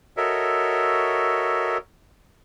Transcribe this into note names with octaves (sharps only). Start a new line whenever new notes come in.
F#4 A4 A#4 C#5 D#5 E5